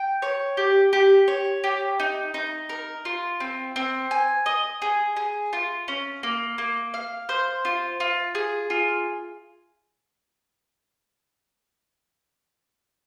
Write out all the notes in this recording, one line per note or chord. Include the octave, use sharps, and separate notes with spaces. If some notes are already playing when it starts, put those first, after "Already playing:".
Already playing: G5
C#5
G4
G4
C#5
G4
D#4
D#4
A#4
F4
C4
C4
G#5
D#5
G#4
G#4
F4
C#4
A#3
A#3
F5
C5
F4
F4
G#4
F4